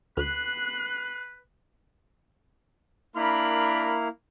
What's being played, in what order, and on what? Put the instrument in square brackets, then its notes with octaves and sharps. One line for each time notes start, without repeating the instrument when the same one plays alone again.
[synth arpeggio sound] D2 [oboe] B4 [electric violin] F#6 C7
[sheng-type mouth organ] A#3 E4 F6 [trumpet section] D4 A#4 B5